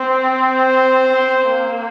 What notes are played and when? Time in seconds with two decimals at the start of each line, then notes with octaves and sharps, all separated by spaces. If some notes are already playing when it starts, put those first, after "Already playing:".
Already playing: C4 C5
0.41 C5
1.12 C4
1.47 A#3